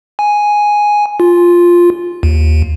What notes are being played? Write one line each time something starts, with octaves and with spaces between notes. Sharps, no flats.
G#5
F4
D#2